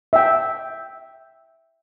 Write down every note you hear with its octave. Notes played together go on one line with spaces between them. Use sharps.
E5 G5